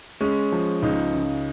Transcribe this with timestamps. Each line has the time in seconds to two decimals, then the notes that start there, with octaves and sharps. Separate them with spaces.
0.20 G#3 C#4
0.52 F3
0.82 C#2 D#4
1.14 C#3